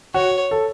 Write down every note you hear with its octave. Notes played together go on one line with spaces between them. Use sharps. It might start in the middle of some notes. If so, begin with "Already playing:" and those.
F#4 C#5
A4